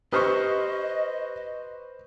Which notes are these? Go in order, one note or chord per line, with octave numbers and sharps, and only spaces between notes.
G4 B4 C5 D#5 C#6 D#6 F6